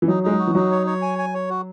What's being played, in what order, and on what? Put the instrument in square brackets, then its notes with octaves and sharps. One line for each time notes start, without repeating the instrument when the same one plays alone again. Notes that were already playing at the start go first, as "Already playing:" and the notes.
[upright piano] E3
[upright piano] F#3 [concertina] D#4
[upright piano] G#3 [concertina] D#4
[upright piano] F#3
[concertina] F#4
[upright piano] E3
[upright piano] F#3 [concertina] D#4
[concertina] C#5
C#5
G#5
G#5
C#5
F#4